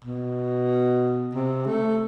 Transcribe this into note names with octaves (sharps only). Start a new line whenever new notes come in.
B2
C3
A3